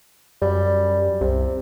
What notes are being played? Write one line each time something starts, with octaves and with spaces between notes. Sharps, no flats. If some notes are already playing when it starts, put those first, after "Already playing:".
F#2 G3
C2 C3